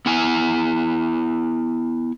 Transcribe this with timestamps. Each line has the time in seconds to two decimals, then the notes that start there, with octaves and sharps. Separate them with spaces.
0.06 B3 E4 G#5